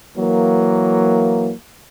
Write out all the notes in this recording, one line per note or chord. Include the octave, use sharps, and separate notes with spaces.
E3 F#3 A#3